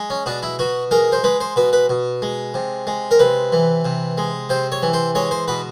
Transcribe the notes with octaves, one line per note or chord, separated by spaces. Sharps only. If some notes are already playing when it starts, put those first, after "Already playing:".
Already playing: G#3
C#4
B2 D4
E4
B2 F#4
G#3 A#4
C5
G#3 B4
C5
B2 B4
B4
B2
G#3
C3
G#3
A#4
C3 B4
E3
C3
G#3
C3 C5
C#5
E3
C5
G#3 C#5
C5
B2 B4